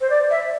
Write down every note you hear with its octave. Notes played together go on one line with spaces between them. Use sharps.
C5
D5
E5